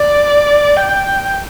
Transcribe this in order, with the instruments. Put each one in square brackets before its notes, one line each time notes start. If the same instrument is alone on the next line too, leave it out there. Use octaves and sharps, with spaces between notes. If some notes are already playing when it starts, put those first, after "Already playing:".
Already playing: [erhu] D5
G5